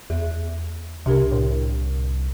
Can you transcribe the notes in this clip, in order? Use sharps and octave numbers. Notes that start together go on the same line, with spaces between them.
E2 G#4 E5
C2 C3 D4 G4 A#4
A2